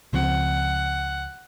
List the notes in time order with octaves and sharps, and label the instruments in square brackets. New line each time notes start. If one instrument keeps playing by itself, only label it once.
[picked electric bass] C#2 F3 C4 [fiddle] F#5